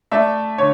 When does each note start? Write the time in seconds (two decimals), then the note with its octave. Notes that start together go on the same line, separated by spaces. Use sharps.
0.12 A3 D5 E5
0.58 D3 C#5